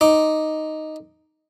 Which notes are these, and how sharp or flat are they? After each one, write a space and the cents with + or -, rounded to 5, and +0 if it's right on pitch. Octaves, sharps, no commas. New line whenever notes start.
D#4 +0 D6 +0